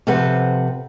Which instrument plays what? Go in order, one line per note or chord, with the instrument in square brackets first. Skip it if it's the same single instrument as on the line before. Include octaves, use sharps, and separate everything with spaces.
[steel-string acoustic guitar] C3 F3 A4 B4 C5 F#5